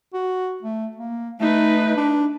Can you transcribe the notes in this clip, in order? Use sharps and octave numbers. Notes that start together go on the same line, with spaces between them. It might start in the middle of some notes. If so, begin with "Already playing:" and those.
F#4
A3
A#3
A3 D#4 B4
D4